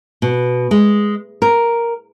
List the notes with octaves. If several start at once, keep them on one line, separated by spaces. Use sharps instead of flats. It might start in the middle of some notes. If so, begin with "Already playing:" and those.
B2
G#3
A#4